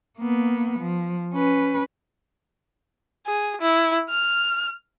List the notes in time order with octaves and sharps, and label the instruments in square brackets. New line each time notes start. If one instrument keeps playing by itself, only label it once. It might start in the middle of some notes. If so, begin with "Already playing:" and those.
[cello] A#3 B3
F3
C#4 B4
[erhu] G#4
E4
F6